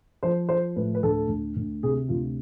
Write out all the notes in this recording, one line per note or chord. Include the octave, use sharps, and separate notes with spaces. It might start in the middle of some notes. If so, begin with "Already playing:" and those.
F3 C5
F3 C5
A2 B4
B4
D2 A4
D2
D2
C3 G#4
D2 F4